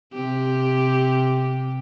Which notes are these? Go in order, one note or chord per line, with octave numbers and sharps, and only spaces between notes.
C3 G4